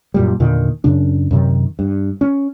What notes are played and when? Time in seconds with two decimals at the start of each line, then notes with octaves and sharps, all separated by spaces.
0.14 F#2 A#2 G3
0.40 E2 A#2 D3 D#3
0.84 F#2 C#3 D4
1.31 F#2 C3 D#3
1.79 G2
2.21 C#4